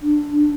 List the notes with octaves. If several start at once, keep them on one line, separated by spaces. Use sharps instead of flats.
D4